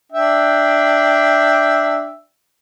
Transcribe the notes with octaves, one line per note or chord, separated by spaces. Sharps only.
D4 E5 G5